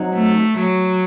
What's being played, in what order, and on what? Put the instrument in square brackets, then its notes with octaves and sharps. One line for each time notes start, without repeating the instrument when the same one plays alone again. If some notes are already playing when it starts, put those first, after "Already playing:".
Already playing: [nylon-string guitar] F#3 C4 D#4 F#4
[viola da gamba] A3
F#3